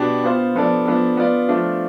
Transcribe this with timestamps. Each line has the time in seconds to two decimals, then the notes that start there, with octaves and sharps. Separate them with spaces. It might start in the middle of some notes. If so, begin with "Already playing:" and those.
Already playing: B2 B3 D4 G4
0.24 B3 F4 C5
0.56 F3 B3 D4 A4 D5
0.86 F3 B3 D4 A4
1.17 B3 F4 B4 D5
1.48 F3 A3 D4 F4